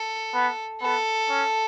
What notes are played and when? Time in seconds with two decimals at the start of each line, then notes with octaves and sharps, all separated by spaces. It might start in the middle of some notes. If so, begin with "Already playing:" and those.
Already playing: A4
0.34 B3
0.81 B3 A4
1.29 C#4